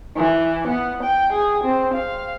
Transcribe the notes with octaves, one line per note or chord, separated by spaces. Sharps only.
E3
B3
G5
G#4
C4
F5